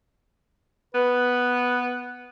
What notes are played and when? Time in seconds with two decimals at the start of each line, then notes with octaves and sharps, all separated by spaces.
0.95 B3 B4